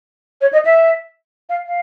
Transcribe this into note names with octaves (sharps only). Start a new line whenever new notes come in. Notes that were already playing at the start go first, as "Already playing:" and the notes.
C#5
D#5
E5
F5
F5